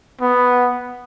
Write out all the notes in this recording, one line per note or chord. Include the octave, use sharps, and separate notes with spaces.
B3